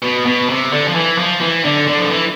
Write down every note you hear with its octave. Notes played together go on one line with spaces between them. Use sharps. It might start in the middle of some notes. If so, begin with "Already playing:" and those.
B2
B2
C3
D3
F3
E3
F3
E3
D3
D3
F3
E3